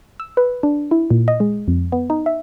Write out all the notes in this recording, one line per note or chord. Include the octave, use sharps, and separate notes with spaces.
E6
B4
D4
E4
A#2
D#5
G#3
F2
B3
D#4
E5